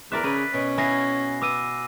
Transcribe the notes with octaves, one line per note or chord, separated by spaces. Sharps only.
E2 A#4 D5 E5 F#6
C#3 B4
B2 C#4
B3 E4 G#5 A#6 C7
B3 D6 E6 D#7